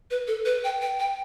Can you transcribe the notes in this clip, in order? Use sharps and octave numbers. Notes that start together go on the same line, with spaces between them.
B4
A4
B4
G5
G5
G5